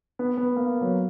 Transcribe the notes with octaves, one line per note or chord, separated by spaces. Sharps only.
B3
B3
A#3
F#3